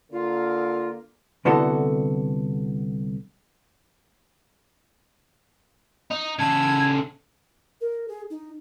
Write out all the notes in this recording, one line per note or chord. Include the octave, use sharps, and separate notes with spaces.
D3 A#3 F4
C2 D3 B3 E4 F#4 A4
D#4
C#3 A4 G#6
A#4
G#4
D#4